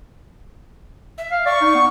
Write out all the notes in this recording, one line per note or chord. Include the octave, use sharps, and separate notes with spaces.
E5
F5
D5 C#6
D#4
B3